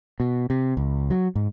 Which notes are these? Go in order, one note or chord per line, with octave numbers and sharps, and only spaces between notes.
B2
C3
C#2
F#3
G#2